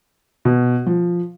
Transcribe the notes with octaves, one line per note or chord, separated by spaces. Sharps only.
B2
F3